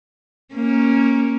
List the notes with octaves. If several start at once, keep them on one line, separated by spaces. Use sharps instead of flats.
A#3 C#4